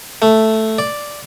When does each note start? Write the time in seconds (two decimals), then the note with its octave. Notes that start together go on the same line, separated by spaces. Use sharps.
0.22 A3
0.78 D5